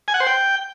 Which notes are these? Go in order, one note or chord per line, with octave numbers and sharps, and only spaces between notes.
G#5
F#5
C5
G5